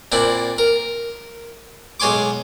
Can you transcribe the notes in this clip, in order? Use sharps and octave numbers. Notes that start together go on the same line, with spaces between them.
A#2 C4 D4 E4
A#4
B1 G#3 C#5 G#5 C6 D6